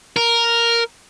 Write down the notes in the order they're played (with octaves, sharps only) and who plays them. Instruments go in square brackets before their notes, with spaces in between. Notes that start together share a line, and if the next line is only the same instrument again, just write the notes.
[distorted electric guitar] A#4